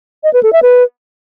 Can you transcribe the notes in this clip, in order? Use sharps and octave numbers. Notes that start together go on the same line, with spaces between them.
D#5
B4
A4
E5
B4